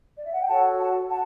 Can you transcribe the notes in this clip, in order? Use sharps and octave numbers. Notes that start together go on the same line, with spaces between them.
D5
E5
F#5
G5
F#4 A4 C#5 F#5 A5
F#5 A5
F#5 A5